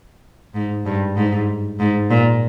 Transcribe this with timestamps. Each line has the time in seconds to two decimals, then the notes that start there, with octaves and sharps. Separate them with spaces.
0.54 G#2
0.85 G2
1.17 G#2
1.80 G#2
2.11 A#2